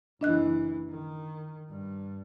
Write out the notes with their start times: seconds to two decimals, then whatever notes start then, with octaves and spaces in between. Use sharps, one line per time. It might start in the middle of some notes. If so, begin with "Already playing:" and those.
0.21 F#1 E3 D4 D#5 F#6
0.90 D#3
1.69 G2